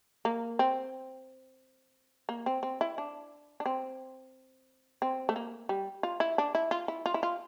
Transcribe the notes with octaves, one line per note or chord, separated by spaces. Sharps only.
A#3
C4
A#3
C4
C4
E4
D4
D4
C4
C4
A3
A#3
G3
F4
E4
D4
E4
F4
E4
F4
E4
F4